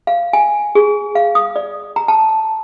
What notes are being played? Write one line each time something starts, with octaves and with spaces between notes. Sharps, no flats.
F5
G#5
G#4
F5
D#6
D5
A#5
A5